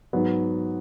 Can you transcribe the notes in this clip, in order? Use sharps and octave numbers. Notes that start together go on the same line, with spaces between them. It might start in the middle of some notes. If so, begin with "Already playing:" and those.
G#2 F#3 B3